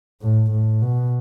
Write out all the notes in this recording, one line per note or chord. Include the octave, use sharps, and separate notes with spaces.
A2
A2
B2